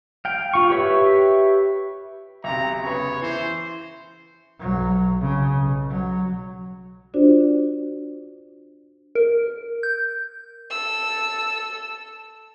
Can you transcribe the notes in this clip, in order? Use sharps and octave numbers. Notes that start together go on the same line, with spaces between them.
F5 G5
F4 C#6
G4 B4 C#5 E5
B1 C3 A#5
C#3 B3 C#5
E3 C5
B1 F#3
C#3
B1
F#3
D4 F4 F#4 C5 D5
A#4
G6
A4 E6